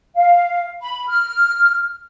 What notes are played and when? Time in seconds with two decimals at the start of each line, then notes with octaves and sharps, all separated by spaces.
0.16 F5
0.81 B5
1.08 F6